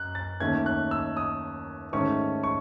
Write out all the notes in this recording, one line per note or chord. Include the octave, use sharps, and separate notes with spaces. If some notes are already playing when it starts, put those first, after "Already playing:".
Already playing: F#2 F#6
A6
D#2 D#3 A3 C#4 G#6
F#6
E6
D#6
G#2 D#3 A3 C#4 C#6
C#6